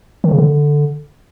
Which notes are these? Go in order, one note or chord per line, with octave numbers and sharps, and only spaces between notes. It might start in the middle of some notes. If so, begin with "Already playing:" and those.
D#3
C#3
D3